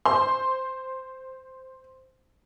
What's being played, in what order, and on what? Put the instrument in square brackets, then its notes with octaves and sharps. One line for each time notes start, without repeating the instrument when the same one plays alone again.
[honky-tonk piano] C5 C6